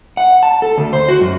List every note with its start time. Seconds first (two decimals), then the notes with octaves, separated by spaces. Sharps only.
0.17 F#5
0.43 A5
0.62 A4
0.78 D2
0.93 C5
1.08 F#4
1.21 F#2